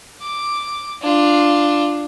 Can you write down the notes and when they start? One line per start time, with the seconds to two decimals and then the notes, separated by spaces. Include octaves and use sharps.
0.22 D6
1.02 D4 F4